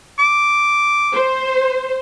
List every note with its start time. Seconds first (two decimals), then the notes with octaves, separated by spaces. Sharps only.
0.19 D6
1.13 C5